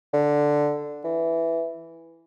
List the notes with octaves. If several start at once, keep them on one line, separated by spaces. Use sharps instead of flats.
D3
E3